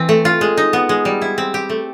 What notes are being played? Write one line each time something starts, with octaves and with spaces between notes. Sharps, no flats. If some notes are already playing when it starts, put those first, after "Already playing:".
Already playing: E3 C4
A3
F4
G#3
D#4
B3
G#3
G3
E4
C4
G4
A3